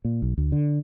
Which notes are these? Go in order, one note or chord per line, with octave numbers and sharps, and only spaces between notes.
A#2
B1
D2
D3